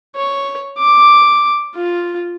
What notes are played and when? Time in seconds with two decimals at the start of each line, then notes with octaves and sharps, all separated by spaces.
0.16 C#5
0.79 D6
1.76 F4